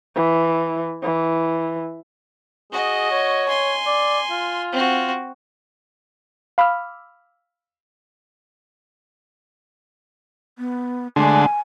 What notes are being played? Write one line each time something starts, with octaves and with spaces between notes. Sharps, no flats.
E3
E3
F#4 G#4 D#5
C#5
G#5 C6
D5
F4
C4 F#4
F5 B5 D6 E6 F6
B3
D3 G#3 A3 D4 F#5 G#5 C6